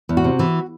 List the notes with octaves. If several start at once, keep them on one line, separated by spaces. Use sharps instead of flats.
E2
F#4
C3
E3